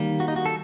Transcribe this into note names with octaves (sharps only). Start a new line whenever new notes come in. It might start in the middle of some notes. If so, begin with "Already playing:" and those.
Already playing: D#3 G3 A#3
F#4
D#4
F#4
A4